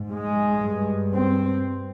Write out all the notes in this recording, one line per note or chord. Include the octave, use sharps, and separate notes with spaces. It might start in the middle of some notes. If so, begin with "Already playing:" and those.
Already playing: G#2
G#3
G2
C4